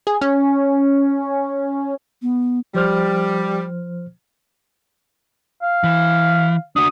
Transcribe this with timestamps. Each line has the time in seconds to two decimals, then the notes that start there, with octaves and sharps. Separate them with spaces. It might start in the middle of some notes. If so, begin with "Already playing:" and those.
0.07 G#4
0.21 C#4
2.22 B3
2.74 F3 G3 C5 F6
5.62 F5
5.84 E3
6.76 D4 F#4 D#6